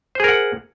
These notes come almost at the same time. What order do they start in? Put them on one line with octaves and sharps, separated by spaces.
C5 G#4 A#4 F#5